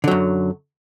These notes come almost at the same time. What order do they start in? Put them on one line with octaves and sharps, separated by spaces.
D3 F#3 F#2